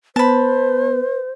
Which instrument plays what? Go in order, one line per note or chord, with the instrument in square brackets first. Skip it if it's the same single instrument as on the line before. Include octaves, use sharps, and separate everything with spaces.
[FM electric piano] B3 [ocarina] B4 [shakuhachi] C5 [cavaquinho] A5 B5